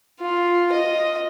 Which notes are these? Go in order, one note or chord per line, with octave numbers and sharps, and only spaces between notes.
F4
D#5